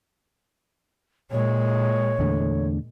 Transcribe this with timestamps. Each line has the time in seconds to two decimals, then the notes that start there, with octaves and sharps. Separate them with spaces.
1.31 A#2 G#3 C#5
2.19 E2 D3 A3